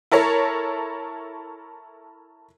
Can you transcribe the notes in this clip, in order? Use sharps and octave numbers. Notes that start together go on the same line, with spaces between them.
E4 A4 A#4 C#5